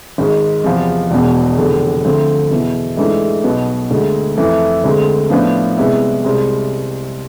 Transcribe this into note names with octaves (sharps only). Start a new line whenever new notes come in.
G#1 G#2 G#3
E2 C3 F3
E1 E2 B2
F1 E2 D3
D2 D3 F3 A3 C4
E2 B2 B3 E4
G#2 E3 A3 D4
B1 B2 B3
D2 D3 G#3
F2 E3 A3 E4
D2 D3 G#3 C4
A2 F3 B3 D4
C2 C3 G#3 B3 E4
C2 C3 G#3 C4